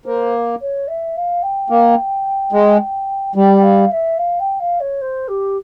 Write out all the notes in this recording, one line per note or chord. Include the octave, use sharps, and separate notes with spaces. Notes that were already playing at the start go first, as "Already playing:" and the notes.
A#3 C5
C#5
E5
F5
G5
A#3
G#3
G3 G5
F5
E5
F5
G5
F5
C#5
C5
G4